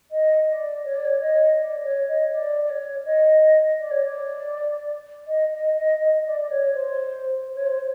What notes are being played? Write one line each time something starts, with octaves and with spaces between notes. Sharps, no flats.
D#5
D5
C#5
D5
C#5
D#5
D5
C#5
D#5
D5
D5
C#5
D#5
D5
C#5
D5
D#5
D#5
D#5
D#5
D5
D5
C#5
C5
C5
C#5
C5